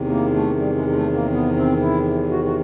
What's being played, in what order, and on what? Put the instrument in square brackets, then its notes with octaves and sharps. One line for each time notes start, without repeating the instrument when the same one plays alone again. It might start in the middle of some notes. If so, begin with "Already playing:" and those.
Already playing: [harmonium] E2 C3 D#3
A#3
A3
G3
G#3
G#3
A3
A#3
B3
C4
E4
F#4
F#4